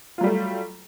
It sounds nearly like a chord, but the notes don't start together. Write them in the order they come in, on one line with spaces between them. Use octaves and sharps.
F4 F#3 G3 A3